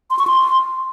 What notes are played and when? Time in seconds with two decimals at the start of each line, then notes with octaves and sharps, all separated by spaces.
0.10 C6
0.19 C#6
0.27 C6